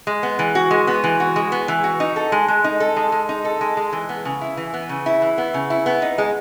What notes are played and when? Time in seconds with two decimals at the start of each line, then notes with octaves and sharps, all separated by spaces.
0.07 G#3
0.23 B3
0.39 E3
0.55 F#4
0.71 G#3
0.87 B3
1.04 E3
1.20 F#4
1.36 G#3
1.52 B3
1.68 E3
1.84 F#4
2.00 D#4
2.16 A4
2.32 G#3
2.48 G#3
2.64 D#4
2.80 A4
2.96 G#3
3.12 G#3
3.29 D#4
3.45 A4
3.61 G#3
3.77 G#3
3.93 E3
4.09 B3
4.25 C#3
4.41 E4
4.57 E3
4.73 B3
4.89 C#3
5.06 E4
5.22 E3
5.38 B3
5.54 C#3
5.70 E4
5.86 B3
6.02 D#4
6.18 G#3